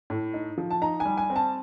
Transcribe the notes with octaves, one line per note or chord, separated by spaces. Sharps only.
A2
D#4
F3
A5
D#4 A#5
G#5
G3
G#5
C4
A5